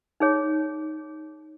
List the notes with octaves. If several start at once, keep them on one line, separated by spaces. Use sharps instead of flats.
D#4 G#4 C#5